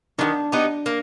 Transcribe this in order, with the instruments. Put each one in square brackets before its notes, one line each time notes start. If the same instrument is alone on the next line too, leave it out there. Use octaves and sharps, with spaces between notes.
[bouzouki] D#3 G#3 B3 [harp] D4
[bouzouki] B3 D#4 G4
A#3